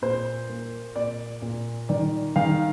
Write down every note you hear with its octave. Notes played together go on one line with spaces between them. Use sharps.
A#2 C5
A#3
A#2 D5
A#2
D#3 D5
D#3 F5